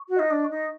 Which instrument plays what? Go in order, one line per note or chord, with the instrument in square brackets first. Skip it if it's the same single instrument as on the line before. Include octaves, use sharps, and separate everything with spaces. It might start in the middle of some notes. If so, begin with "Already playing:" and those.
Already playing: [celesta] C#6
[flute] F#4
[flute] D#4 [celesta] D#5
[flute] D4
[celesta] C#6
[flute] D#4